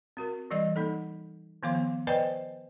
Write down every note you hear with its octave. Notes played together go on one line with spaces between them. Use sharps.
C4 F#4 A#4
E3 G3 D5 D#5
A#3 D#4 A4
D#3 F3 B3 F5 C6 D6
B3
B4 C5 D5 D#5 G5 G#5